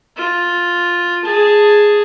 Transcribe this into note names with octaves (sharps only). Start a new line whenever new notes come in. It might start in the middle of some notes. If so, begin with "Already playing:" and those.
F4
G#4 A5